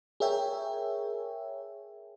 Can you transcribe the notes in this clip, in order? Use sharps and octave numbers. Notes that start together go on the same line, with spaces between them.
G#4 A#4 C#5 E5 G5 G#5